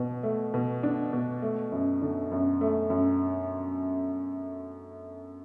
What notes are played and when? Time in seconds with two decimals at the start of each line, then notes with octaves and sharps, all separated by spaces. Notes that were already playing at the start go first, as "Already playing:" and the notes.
Already playing: B2
0.23 A3
0.54 B2
0.83 D4
1.13 B2
1.42 A3
1.72 F#2
2.01 D3
2.31 F#2
2.61 A3
2.90 F#2